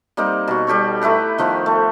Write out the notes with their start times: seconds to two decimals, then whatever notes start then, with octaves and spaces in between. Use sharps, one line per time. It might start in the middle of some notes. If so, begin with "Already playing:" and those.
0.17 G3 A#3 C4 D#4
0.48 B2 F#4
0.67 G3 G4 A4 C#5
1.01 A3 E4 B4 A#5
1.38 D#3 F3 B3 C5
1.66 A3